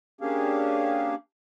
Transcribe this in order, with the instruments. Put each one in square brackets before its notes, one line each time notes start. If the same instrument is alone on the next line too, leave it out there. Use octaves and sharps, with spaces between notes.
[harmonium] A#3 C#4 D4 G4 G#4 F5